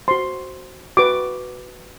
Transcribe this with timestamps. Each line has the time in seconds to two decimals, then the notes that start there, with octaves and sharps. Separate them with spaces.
0.08 F#4 C5 C6
0.97 F#4 B4 D6